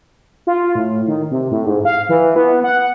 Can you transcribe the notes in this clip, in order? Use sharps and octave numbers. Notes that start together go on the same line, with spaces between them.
F4
A2
D#3
C3
A2
G#2
F5
E3
B3
F#5